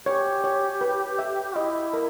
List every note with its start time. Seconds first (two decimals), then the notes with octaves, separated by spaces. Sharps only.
0.06 G4 C#5
0.44 C#5
0.81 B4
1.19 E5
1.56 E4 D#5
1.93 A#4